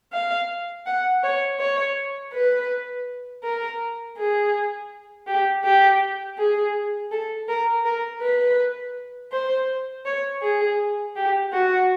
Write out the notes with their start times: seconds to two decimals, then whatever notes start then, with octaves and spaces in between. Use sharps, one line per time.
0.13 F5
0.86 F#5
1.24 C#5
1.60 C#5
2.33 B4
3.44 A#4
4.18 G#4
5.27 G4
5.64 G4
6.38 G#4
7.12 A4
7.49 A#4
7.85 A#4
8.22 B4
9.32 C5
10.06 C#5
10.42 G#4
11.16 G4
11.53 F#4